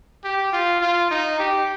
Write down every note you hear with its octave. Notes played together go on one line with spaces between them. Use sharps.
G4
F4
F4
D#4
G4